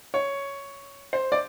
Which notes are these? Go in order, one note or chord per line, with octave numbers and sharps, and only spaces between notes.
C#5
C5
D5